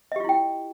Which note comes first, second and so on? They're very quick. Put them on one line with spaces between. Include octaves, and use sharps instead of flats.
D#5 G4 F4 E4 G5